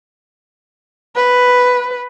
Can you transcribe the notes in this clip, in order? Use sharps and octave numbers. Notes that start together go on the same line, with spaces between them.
B4